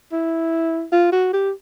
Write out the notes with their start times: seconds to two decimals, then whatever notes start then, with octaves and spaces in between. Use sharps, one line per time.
0.12 E4
0.92 F4
1.12 F#4
1.33 G4